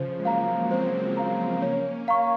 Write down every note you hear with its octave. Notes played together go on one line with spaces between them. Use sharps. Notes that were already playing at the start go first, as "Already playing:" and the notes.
Already playing: C#3 F3 C5
G#3
F#3 A#3 F5 A#5
G#3 C4 C5
F5 A#5
A#3 C#4 C#5
F5 A#5 C#6